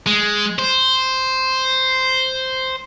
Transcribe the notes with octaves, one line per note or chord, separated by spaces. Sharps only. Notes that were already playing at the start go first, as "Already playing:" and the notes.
G#3
C5